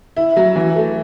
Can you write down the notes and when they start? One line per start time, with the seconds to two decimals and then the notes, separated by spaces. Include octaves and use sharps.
0.16 E4
0.37 F#3
0.56 E3
0.76 A3